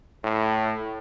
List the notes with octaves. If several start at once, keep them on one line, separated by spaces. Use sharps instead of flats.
A2